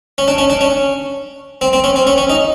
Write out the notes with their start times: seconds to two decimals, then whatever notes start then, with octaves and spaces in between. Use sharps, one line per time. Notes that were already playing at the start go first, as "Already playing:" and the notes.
0.18 C#4
0.28 D4
0.38 C#4
0.50 D4
0.61 C#4
1.61 C4
1.73 C4
1.84 C#4
1.96 C4
2.07 C#4
2.18 C#4
2.30 D#4